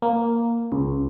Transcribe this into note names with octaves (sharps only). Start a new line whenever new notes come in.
A#3
C#2